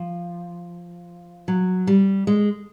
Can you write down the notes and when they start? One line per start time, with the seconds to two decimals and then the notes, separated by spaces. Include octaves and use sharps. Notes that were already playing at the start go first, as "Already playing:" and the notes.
Already playing: F3
1.48 F#3
1.87 G3
2.27 G#3